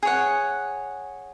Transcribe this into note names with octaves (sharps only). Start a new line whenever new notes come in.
G#4 C#5 F#5